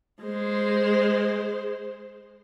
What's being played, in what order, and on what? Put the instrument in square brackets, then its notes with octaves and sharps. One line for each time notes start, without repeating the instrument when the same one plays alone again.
[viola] G#3 C5